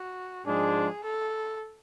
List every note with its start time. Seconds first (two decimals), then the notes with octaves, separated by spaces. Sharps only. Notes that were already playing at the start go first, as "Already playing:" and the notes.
Already playing: F#4
0.46 G#2 F3 G#3 D4 G#4
1.04 A4